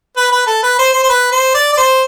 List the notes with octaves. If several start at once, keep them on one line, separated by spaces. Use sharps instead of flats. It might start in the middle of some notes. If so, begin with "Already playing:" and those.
B4
B4
A4
B4
C5
C5
C5
B4
C5
D5
D5
C5